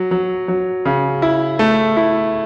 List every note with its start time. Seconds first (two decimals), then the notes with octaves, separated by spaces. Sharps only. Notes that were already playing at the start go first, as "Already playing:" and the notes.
Already playing: F#3
0.11 F#3
0.48 F#3
0.85 C#3
1.22 E4
1.59 A3
1.97 E4